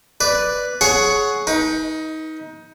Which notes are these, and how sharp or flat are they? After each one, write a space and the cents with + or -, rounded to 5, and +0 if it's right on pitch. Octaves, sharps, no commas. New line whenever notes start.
B4 +0 D5 +0
G#4 +20 C#5 +0 F#5 +0
D#4 +20 B4 -25